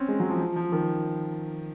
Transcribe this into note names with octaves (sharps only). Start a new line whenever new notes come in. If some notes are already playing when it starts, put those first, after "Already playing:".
Already playing: C4 C#4
G#3
F#3
F3
F3
F3
D#3